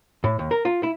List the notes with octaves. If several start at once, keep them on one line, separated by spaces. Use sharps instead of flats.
A2
D#2
A#4
F4
E4